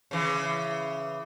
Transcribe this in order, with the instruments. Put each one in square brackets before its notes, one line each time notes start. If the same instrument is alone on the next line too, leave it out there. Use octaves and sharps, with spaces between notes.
[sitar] C#3 E3